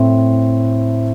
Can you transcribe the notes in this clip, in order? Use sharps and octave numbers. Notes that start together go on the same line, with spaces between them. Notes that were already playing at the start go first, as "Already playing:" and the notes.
Already playing: A2 A3 C4